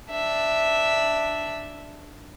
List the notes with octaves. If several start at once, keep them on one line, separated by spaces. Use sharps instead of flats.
D4 E5